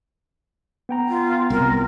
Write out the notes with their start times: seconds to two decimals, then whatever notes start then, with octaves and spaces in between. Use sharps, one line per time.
0.89 B3 G5 A#5
1.08 F4
1.50 C2 A#4